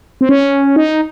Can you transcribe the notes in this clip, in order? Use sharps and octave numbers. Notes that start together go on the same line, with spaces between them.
C4
C#4
D#4